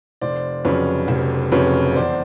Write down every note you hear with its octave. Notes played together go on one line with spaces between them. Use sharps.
F1 C5 D5
F2 C#3 F#3 B4 C#5
F1
F2 C#3 F#3 B4 C#5
E2 C5 D5